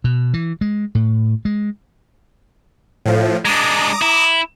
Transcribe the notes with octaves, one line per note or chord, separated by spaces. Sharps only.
B2
E3
G#3
A2
G#3
A2 F3
G#3 D4 A#5 D6 D#6
E4